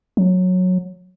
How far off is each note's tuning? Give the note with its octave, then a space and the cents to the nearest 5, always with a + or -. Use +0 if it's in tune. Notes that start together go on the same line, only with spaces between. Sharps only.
F#3 -15